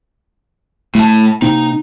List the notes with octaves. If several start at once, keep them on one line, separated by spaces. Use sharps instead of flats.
A2 A3 A5
C3 A#3 C4 D#4